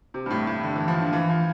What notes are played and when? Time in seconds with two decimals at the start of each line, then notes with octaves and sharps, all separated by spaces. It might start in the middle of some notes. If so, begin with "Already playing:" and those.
0.14 C3
0.26 G2
0.30 A2
0.47 A2
0.63 D3
0.76 E3
0.88 F3
1.01 D3
1.13 E3
1.29 F3